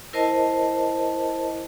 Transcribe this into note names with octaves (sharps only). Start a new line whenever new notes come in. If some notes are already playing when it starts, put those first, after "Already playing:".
E4 A#4 C5 D#5 A5